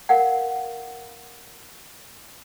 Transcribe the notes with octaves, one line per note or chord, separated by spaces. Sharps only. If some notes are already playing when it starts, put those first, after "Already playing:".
A#4 F5 F#5